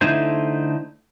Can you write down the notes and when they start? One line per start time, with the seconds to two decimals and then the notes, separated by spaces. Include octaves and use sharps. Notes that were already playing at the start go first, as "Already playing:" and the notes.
0.01 D3 A3 D#4 E4 C5